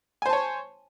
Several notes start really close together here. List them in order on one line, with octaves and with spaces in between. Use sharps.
G#5 C5 A5 C#5